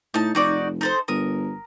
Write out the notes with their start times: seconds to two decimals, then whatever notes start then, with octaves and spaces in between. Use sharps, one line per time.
0.14 A2 D#4 A5
0.35 F1 D#4 F#4 D5
0.81 D#4 A4 C5
1.08 G1 A#4 D#6